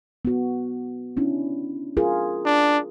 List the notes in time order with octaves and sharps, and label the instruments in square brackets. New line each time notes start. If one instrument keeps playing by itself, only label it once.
[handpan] B3 F#4
C#4 D4 E4
F4 G#4 A#4
[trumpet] D4